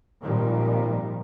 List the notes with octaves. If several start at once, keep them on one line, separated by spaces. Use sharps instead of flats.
G#1 A#2 D#3 F3 G3